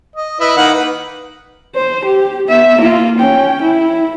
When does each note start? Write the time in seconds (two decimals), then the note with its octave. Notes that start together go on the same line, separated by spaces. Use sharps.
0.16 D#5
0.40 E4 B4 D#5
0.57 D#3 A#3 F#5
0.74 B4
1.75 C5
2.05 G4
2.48 B3 E5
2.78 A#3 F4
3.19 C#4 G5
3.62 E4